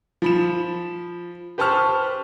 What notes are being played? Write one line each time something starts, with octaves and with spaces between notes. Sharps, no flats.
F3 B5 E7
G4 B4 C5 A5 C#6 F6